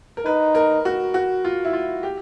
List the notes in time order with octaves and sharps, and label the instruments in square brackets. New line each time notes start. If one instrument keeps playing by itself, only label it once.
[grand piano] A#4
[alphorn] D#4 [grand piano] B4
[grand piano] A#4
F#4
F#4
F4
E4
F4
G4